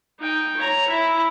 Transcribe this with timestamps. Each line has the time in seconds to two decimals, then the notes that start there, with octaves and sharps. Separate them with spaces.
0.20 D#4 G5
0.57 C#5 A#5
0.88 E4 E5